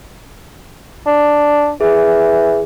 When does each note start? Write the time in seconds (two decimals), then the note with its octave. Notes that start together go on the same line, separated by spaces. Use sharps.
1.06 D4
1.81 E3 G#4